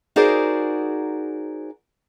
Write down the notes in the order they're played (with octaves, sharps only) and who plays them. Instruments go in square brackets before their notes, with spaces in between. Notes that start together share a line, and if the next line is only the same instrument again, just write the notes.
[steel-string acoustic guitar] D#4 F#4 G#4 A#4 C5 D5